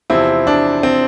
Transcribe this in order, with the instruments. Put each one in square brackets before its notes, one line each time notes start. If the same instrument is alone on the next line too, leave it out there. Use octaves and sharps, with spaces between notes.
[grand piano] E2 C3 F3 C4 E4
D4
C4